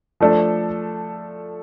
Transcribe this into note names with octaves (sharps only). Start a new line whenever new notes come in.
F3 A3 D4 A4